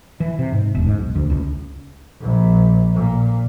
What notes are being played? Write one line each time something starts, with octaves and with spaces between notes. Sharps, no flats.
E3
C3
G#2
E1
G#2
B1
D2
C#2
A#1
A#2